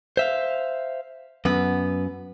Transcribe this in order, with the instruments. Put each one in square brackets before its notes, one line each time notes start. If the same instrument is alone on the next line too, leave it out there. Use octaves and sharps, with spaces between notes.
[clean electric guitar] C5 E5 F5
[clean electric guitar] F#2 [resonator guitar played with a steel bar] B3